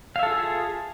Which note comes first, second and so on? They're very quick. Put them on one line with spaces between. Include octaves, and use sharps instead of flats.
F5 E5 A4 F4 G#4